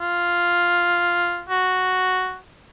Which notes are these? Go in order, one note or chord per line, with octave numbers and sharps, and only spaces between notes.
F4
F#4